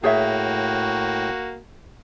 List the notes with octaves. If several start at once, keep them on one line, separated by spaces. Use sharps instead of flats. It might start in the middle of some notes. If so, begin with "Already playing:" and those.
A2 A#3 F#4 G#4 C#5 E5 G5